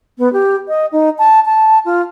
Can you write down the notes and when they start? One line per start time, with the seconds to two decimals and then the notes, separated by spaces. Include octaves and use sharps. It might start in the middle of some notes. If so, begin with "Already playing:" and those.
0.18 B3
0.33 G4
0.68 D#5
0.92 D#4
1.18 A5
1.45 A5
1.85 F4